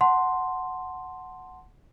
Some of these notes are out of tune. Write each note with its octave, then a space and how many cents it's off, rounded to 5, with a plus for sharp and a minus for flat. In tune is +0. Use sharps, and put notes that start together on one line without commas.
F#5 +0 A5 +0 C6 +0